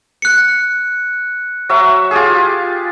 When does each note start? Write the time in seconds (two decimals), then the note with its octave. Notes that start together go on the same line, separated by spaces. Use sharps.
0.22 F#6 C#7
1.69 F#3 F#4 E5
2.11 F4 G4 G#4